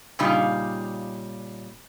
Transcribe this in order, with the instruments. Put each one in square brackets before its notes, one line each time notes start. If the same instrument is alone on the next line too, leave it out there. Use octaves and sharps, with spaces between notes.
[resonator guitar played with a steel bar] A#2 C#3 G3 D#4 F4